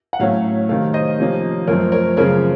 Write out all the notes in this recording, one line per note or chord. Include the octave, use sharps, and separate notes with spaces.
F#5
A2 F#3 A3 C#4 C#5 F5
C3 D#3 A3 C#5 F5
C5 D#5
C3 F3 A#3 C#4
F#2 F3 A3 C4 A#4 C#5
A#4 C#5
F#2 C#3 F3 C4 A#4 C#5